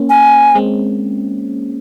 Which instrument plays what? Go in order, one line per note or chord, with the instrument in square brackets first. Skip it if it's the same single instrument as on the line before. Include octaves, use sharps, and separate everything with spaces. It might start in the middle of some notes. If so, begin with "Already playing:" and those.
Already playing: [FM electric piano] A#3 C#4
[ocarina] G#5
[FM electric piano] G#3 C4